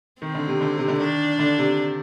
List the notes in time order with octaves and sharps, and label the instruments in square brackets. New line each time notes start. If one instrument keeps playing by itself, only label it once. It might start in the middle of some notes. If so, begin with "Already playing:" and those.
[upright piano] D#3 [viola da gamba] C4
[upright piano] D3
C3
D3
C3
D3
[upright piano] D#3 [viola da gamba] D4
[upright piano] D3
C3